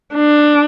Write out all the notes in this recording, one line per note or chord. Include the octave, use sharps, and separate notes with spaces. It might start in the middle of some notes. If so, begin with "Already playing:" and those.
D4